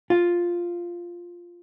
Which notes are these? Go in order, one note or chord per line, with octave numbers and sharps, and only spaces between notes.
F4